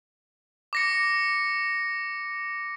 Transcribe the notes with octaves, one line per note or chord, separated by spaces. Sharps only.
D6 A#6 C#7